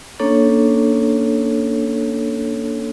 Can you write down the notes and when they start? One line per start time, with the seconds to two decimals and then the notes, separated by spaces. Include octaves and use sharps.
0.19 A#3 C#4 D4 A4 C#5